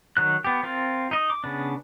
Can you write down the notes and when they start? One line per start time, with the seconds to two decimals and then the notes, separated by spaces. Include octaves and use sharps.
0.17 D#3 F#3 F#6
0.44 B3 G4
0.63 C4 F4 A#4
1.11 D#4 D#5
1.30 D6
1.44 C#3 B3 D4